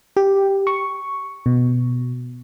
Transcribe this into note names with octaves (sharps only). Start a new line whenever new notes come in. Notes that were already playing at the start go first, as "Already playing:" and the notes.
G4
C#6
B2